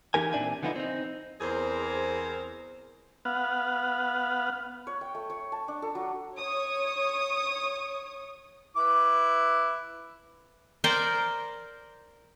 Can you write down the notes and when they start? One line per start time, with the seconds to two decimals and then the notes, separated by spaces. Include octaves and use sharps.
0.14 E3 D#4 G4 A#4 G#5
0.33 A#2 C4 D4 D5 E5 G#5
0.63 D3 F3 B3 D#4 E4
0.76 C4 D#4
1.41 E2 C4 G#4 A#4 C5
3.25 B3 F5 F#5
4.87 C#5
5.01 G5
5.15 A3
5.30 C#5
5.52 A5
5.68 D4
5.82 A4
5.95 F#3
6.36 C#5 C#6 D#6
8.77 E4 B4 D6
10.84 A#4 C5 D5 G5